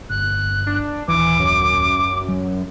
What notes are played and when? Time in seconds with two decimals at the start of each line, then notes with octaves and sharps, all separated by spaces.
0.10 G1 F#6
0.66 D4
1.08 D#1 D#2 E3 D6
1.39 F#2
2.28 F#3